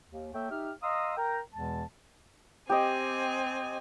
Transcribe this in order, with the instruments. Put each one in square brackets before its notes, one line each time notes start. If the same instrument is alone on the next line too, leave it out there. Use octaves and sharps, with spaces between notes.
[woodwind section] D#2
A#3 A4 C#5 E5 G5
D#4 G4 E5 F6
D#5 F5 A#5 C6 D#6 E6
A#4 G5 A#5
E2 B2 E3 G#3 A5
[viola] C4 G#5 [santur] G4 D#5